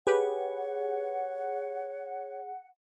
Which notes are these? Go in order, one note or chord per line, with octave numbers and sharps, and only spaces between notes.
G4 G#4 B4 C#5 F#5